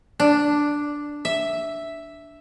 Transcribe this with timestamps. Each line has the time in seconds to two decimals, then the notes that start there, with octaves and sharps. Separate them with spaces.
0.20 D4
1.25 E5